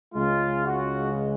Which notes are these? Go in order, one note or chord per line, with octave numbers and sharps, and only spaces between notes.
C#2 C#3 G#3 F4
F#4